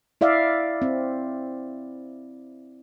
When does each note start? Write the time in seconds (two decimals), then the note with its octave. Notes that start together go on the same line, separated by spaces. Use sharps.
0.21 E4 D5 E5 F5
0.82 C4